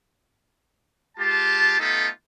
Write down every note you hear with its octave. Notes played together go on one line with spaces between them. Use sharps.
G#3 F4 G4 A5
A3 B3 D#4 F4 G4 A4